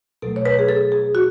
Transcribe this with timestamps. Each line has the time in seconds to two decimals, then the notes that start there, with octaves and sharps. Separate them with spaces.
0.22 B2 F#3 A3 A4
0.36 C#5
0.45 B4
0.59 G#4
0.69 A4
0.92 G#4
1.15 F#4